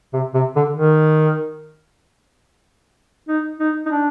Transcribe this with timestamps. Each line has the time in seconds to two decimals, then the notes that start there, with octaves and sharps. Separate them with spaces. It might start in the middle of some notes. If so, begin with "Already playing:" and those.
0.14 C3
0.34 C3
0.56 D3
0.77 D#3
3.28 D#4
3.60 D#4
3.86 D#4
3.91 D4